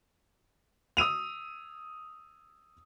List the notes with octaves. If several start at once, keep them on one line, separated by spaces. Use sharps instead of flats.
D#6 E6 D#7 F7